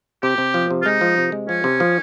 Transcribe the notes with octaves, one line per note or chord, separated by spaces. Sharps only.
C3 G4
C3
F3
C3
F4
G#3 D#4
F3
C3
G#3
F3 C#4
C3
F3